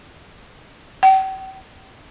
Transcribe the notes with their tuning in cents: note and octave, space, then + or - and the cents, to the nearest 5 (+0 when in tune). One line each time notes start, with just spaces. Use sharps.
G5 -40